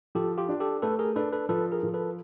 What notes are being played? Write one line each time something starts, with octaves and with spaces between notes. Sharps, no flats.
F3 G4 A4
F4 G4
D4
G4 A4
A3 A4 B4
G#4 A#4
D4 A4 B4
A4 B4
F3 A4 B4
G#4 A#4
F3
A4 B4